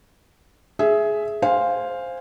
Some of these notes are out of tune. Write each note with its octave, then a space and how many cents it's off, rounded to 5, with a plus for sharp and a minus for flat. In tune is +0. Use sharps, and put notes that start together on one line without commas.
G#4 +15 E5 +0
C5 +0 F5 +0 G#5 -15